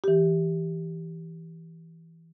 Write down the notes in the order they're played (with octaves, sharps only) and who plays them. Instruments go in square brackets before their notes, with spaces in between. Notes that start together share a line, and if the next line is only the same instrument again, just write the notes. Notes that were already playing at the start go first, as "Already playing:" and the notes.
[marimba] E3 G4